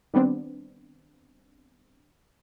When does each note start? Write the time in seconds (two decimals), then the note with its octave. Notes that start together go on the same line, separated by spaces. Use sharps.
0.14 D#3 G3 B3 C4 D4